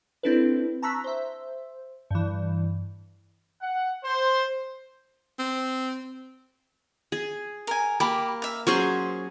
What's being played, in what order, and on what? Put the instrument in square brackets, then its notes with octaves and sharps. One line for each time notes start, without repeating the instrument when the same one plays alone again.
[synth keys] C4 D4 E4 A4 B4
A5 A#5 C#6 E6 F#6 B6
C5 E5
G2 E3
[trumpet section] F#5
C5
[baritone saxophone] C4
[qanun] G#4
[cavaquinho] A#4 G#5
[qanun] A#3 [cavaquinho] G4 B5
[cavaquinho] E5 F5
[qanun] F#3 C#4 G#4 [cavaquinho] C5 C#6